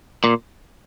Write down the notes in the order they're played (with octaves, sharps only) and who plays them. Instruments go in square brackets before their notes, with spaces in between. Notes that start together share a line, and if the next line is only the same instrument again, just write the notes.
[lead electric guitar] A#2